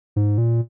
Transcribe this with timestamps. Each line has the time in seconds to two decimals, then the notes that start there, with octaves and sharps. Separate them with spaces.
0.16 G#2
0.38 A#2